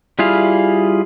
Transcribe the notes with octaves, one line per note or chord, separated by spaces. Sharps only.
G3 E4 F4 G#4 F5